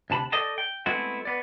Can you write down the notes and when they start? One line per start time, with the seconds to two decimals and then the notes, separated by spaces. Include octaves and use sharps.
0.10 D2 C3 A5 B5
0.32 A4 D5 D#5 G5 A5
0.58 G5
0.86 G#3 A3 B3 C4 E4 F#4
1.25 B3 D5